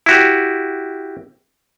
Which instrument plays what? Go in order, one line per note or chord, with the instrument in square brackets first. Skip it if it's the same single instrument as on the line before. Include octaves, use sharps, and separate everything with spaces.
[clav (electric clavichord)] E4 F#4 G4